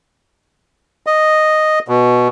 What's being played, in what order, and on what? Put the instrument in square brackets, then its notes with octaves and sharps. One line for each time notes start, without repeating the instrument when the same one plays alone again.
[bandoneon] D#5
B2